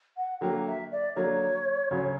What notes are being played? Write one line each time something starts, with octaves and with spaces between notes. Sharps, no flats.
F#5
D3 F#3 A#3 G5
E5
D5
D3 F#3 A#3 C#5
D2 C#3 F#3